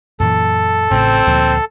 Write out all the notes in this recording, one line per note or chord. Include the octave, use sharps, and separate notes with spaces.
F#2 A#2 E3 A4
A1 A2 C#3 C4
D2 A#2 F3